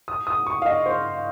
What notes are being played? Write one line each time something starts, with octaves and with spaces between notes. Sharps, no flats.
D#6
D#6
C#6
F5
D#5
C5